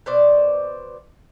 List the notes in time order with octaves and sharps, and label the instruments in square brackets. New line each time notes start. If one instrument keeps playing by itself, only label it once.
[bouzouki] B2 C5 D5